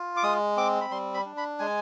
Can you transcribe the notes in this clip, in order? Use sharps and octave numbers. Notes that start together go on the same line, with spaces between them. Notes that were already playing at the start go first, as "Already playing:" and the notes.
Already playing: F4
D6
G#3 D#6
C4 D6
B5
G3 C6
B5
D4
B5
G#3 G#5